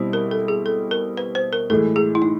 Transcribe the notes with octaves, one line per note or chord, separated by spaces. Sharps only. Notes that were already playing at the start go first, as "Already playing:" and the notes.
Already playing: B2 G3 C4 E4
A#4
A4
G#4
A4
A#4
B4
C5
A#4
A2 E3 G#3 A4
G#4
E4
D#4